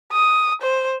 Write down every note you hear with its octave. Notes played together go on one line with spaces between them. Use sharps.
D#6
C5